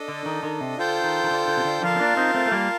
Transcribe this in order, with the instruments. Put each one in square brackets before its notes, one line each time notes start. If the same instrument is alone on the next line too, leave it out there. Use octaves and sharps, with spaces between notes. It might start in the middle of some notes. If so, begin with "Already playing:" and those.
Already playing: [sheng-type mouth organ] D4 A4 D#5
[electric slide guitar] D3
D#3
D#3
C3
[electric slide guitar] D3 [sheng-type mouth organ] F4 A4 C5 G5
[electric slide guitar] D#3
D#3
D3
D3
C3
D3
[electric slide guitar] D3 F3 [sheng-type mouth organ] F4 A#4 F5 A5
[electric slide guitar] C4
A#3 D4
C4 D#4
A3 C4
A3
G3 A#3